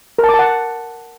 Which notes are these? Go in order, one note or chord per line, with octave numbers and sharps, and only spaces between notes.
A#4
A5
D6
A5
F#5